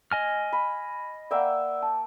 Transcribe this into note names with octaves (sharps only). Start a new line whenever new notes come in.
D#5 G#5 F6
B5
A#3 D5 E5 F#5 G5
A5